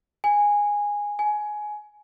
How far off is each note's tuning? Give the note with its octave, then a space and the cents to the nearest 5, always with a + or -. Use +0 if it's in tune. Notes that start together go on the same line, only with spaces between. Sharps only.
G#5 -10
G#5 +15